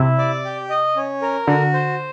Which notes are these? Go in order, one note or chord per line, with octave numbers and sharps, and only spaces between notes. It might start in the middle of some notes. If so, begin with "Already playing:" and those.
Already playing: C3 E4
D5
G4
D#5
C#4
A#4
D3 F#4
C5